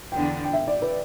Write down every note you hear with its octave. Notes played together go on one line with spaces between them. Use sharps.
E2 D3 B3 D4 G5
G5
E5
D5
B4